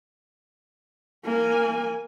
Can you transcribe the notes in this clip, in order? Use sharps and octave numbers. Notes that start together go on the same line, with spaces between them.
A#3 G#5